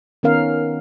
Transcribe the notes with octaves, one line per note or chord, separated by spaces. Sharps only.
D#3 B3 C#4 A#4 F5